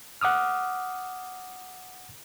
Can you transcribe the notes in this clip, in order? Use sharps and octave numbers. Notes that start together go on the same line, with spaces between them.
F#5 D6 D#6 F6